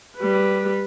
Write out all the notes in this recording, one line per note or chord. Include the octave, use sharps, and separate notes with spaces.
G3 B4